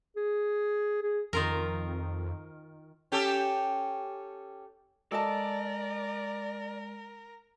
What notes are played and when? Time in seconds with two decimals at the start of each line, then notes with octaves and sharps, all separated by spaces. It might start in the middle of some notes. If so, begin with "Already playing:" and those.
0.16 G#4
1.03 G#4
1.33 F2 D#3 F4 A#4
3.12 C#4 G4 A4
5.12 G#3 A4 A#4 D5 D#5 A5